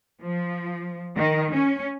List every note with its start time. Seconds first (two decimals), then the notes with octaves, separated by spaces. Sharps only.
0.22 F3
1.17 D#3
1.56 C#4